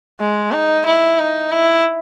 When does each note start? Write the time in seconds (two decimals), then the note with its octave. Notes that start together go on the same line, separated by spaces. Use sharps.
0.20 G#3
0.52 D#4
0.86 E4
1.19 D#4
1.51 E4